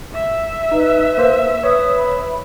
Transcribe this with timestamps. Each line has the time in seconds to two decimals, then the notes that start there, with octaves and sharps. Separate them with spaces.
0.14 E5
0.72 D#4 B4
1.18 A#3 C5
1.64 B4 C#5 D#6
1.97 B5